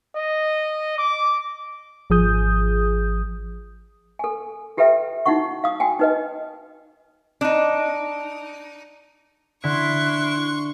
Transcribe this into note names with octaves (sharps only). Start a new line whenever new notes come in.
D#5
D6
G#1 F3 G#4 D#6 G6
A4 G#5
F4 G4 A4 B4 E5 G5
D#4 E4 F#4 F#5 C#6
F5 D#6
F#4 G5 G#5
D#4 B4 D#5
D4 D#4
D3 E4 C6 C#6 F#6